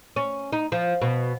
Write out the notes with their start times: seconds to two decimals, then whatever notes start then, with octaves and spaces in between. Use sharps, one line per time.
0.16 C#4
0.52 D#4
0.72 F3
1.02 B2